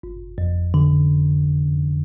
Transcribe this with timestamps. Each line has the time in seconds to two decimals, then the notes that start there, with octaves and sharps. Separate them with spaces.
0.03 G1
0.38 F2
0.74 D3